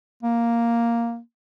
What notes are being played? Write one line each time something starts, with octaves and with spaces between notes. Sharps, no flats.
A#3